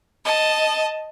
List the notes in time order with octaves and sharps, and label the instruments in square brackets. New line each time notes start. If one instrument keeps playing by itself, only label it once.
[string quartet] D#5 A5